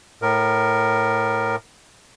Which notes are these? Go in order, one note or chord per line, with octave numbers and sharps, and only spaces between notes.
A2 A#4